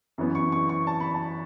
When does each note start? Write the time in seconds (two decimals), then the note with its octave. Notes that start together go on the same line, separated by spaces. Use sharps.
0.18 F#2 E3 B3
0.35 C#6
0.52 C#6
0.69 C#6
0.87 A5
1.00 B5
1.14 A5